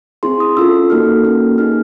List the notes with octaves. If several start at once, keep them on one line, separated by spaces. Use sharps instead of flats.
C4 E4 G#4 C6
D#6
C#4 F4 A4 E6
A#3 D#4 F#4 A4 F6
A#3 C#4 F#4 A4
A#3 D#4 G#4 F6